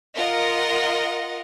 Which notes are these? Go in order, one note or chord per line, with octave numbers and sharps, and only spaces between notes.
F4 A#4 D#5 F#5